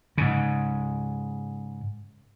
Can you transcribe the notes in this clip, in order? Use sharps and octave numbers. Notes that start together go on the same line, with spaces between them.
G#2 C#3